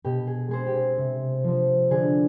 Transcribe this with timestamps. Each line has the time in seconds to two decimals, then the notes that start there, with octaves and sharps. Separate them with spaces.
0.04 B2 G4
0.27 G#4
0.49 G#3 C4 G#4 C5
0.67 G4
0.75 G#4
0.98 C3
1.44 F3 C4
1.90 D3 G#4